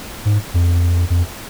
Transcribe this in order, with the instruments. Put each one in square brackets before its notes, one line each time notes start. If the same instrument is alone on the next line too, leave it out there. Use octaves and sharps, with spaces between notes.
[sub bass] G#2
F2
F2